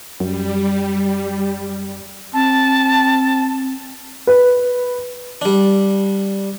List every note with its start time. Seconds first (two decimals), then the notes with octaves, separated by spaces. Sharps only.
0.20 F#2 G3
2.34 C4 A5
4.27 B4
5.41 G3 D4